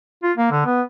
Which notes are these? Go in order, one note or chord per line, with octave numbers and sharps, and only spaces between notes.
F4
A#3
D3
B3